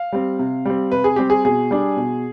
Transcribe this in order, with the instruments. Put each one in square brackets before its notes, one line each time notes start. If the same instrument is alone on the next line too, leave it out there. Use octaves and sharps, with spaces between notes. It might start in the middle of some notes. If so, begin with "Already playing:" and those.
Already playing: [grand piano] F5
G3 C4
C3
G3 C4
C3 B4
G#4
G3 C4 G4
G#4
B2 G#4
G3 D4
B2